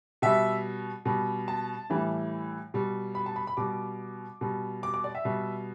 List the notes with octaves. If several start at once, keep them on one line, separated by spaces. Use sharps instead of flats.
B2 G3 E5
B2 G3
A5
A2 E3 G3
B2 G3
B5
A5
B5
B5
B2 G3 D6
B2 G3
D6
D6
D5
E5
B2 G3